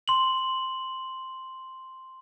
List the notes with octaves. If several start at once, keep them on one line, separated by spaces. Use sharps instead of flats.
C6 F#7